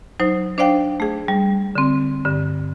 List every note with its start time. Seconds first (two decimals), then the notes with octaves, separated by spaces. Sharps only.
0.20 F#3 D#4 C5
0.58 D4 C5 D5 F5 G5
1.00 A3 G#4
1.28 G3
1.75 D3 C4
2.25 G2 D3